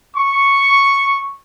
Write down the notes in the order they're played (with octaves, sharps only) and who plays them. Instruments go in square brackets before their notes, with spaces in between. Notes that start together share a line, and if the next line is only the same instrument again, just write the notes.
[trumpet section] C#6